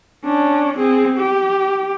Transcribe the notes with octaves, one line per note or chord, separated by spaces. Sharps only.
C#4 D4
C4 G#4
G4